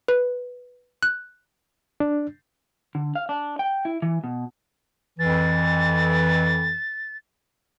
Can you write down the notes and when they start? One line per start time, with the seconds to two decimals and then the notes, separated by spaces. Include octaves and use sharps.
0.08 B4
1.03 F#6
2.00 D4
2.95 D3
3.15 F5
3.29 D4
3.59 G5
3.85 E4
4.02 E3
4.24 B2
5.19 F2 E3 A6